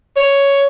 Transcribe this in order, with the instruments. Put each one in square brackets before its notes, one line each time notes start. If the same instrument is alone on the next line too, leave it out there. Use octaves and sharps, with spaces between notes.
[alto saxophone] C#5